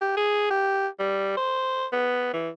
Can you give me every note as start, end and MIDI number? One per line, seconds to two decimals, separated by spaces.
0.01 0.12 67
0.17 0.47 68
0.50 0.87 67
0.99 1.37 55
1.37 1.86 72
1.92 2.31 59
2.33 2.49 52